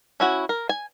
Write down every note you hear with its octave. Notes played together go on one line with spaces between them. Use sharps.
C#4 E4 F#4
A#4
G#5